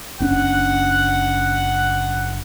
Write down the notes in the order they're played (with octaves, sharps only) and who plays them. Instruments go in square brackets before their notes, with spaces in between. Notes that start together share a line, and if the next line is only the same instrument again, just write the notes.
[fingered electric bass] F#1 C#4 D4 [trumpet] F#5